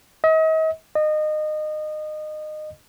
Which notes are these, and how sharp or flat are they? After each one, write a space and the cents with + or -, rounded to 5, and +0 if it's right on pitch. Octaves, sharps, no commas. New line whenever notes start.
D#5 +40
D#5 -25